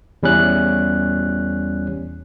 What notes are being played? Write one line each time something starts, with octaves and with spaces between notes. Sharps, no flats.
E2 G3 C#4 F#6